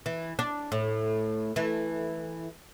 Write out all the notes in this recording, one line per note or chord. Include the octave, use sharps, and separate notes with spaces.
E3
D4
A2
E3 A3